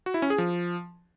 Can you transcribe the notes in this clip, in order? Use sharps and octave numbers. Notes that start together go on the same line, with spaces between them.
F#4
E4
C#4
G#4
F3